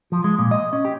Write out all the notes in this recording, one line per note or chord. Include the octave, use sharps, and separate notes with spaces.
F3
G#3
A#2
D#5
C#4
G4